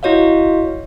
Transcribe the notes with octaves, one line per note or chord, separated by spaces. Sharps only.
E4 F#4 C#5 D#5 F5